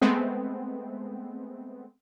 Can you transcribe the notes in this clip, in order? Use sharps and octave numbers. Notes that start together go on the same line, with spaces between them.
G#3 A3 B3 C4